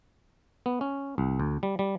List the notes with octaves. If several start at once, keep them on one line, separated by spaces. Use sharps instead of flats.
B3
C#4
C2
D2
G3
G3